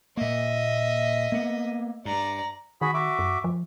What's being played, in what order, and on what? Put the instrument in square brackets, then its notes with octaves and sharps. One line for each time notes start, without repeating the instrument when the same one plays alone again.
[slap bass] A#2 A#3 [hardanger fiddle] D#5 E5
[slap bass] A#3 B3
[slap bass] G2 [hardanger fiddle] D5 A#5
[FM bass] D#3 [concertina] F#4 G#4 B5
[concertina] F#4 E5 D6
[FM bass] F#2
F3